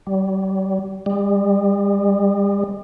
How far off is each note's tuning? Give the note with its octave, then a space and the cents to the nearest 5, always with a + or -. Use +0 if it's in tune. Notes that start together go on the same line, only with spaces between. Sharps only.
G3 -35
G3 +40